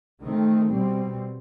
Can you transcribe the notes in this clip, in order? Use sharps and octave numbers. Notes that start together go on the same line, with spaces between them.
D#3 A3 C4
B2 G3 C4